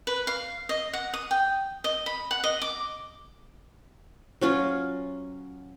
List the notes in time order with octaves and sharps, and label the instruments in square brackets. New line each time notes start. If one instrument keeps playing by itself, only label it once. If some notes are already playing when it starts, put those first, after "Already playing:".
[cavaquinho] B4
F5
D#5
F#5
D#6
G5
D#5
B5
F#5
D#5
D6
[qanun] F#3 C#4 F4